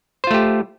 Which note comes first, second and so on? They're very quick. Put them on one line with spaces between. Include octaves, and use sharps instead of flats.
C5 F4 A3 G4